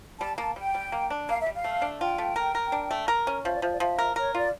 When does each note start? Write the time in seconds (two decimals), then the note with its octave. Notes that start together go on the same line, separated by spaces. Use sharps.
0.20 G3 A5
0.38 A#3 A5
0.56 G3 G5
0.75 G3
0.92 A#3
1.10 D4
1.28 A#3 F5
1.40 E5
1.46 G3
1.53 F5
1.64 A3
1.82 D4
2.01 F4 G5
2.18 A3
2.36 A#4
2.55 A#4
2.72 D4
2.91 A3
3.08 A#4
3.27 C#4
3.44 F3 E5
3.54 D5
3.62 F3 E5
3.71 D5
3.80 F3 E5
3.98 A#4
4.16 A#4 C#5
4.35 F4 D5